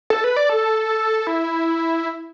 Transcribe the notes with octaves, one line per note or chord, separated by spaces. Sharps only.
A4
B4
D5
A4
E4